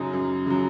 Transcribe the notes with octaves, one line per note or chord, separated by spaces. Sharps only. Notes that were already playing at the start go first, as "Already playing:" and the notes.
Already playing: F#2 C#3 F#3 D#4
F#2
C#3 F#3